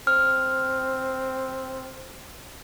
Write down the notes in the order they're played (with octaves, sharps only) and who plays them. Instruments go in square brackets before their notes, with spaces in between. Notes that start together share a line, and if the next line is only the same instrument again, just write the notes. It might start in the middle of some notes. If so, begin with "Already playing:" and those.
[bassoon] C4 [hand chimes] F6